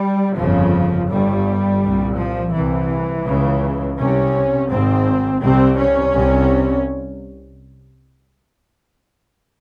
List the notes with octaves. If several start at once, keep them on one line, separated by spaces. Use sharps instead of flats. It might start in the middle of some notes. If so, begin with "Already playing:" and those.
Already playing: G3
G1 F2 C#3 F3
G1 G2 G3
C2 A#2
F3
C2 C3 E3
C#2 C#3
C2 C3 C#4
G#1 G#2 C4
C2 C3 C4
C#4
C2 C3